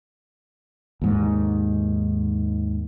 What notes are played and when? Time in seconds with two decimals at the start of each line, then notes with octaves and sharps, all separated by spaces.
1.02 D#2 G#2 D#3